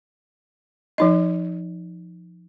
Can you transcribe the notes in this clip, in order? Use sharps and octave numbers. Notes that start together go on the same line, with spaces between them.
F3 D#4 D#5